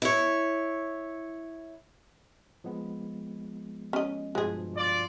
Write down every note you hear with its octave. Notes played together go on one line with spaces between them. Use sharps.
E4 C#5
F3 G#3 B3
C#4 D#5
G2 B2 F3 G#3 G#4
F4 D5